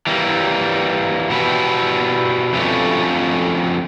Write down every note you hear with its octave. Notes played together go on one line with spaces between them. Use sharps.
E3 G3 A#3
B2 G3 B3 E4
F2 D3 F3 A3 C#4